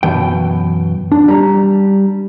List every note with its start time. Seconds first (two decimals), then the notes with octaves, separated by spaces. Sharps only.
0.03 F#2 B2 E3 G5
1.12 D4
1.28 G3 A#5